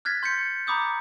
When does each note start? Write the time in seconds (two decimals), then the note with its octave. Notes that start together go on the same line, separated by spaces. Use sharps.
0.05 F6 F#6 G#6 A6 B6
0.23 C6 G6 B6 C#7
0.67 A#5 B5 D6 D#6 G6